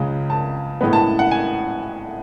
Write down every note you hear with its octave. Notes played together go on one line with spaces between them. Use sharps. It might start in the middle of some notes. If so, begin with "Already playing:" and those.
Already playing: C#2 C#3 G#3
A5
A2 G#3 B3 B5
A5
F#5
G#5